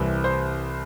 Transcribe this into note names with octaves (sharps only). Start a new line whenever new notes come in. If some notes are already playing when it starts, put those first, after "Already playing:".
Already playing: C2 C3 E3
C5